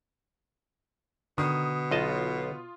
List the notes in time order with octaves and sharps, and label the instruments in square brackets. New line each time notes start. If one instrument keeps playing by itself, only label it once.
[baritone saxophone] B2 [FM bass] D3 [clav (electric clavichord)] D#3 [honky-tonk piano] D#6
[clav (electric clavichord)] B1 D#5 A5 [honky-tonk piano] F4